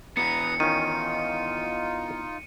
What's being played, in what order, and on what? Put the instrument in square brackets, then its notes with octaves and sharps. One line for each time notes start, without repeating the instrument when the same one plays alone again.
[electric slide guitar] B3 E4 F#4 [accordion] B4 A#5 D#6 [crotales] C#7
[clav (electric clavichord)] D#3 C#4 [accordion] D#4 F4 [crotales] D#7